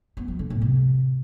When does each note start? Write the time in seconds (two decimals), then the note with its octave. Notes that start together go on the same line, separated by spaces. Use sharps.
0.17 B3
0.28 F3
0.39 D3
0.50 A2
0.62 C3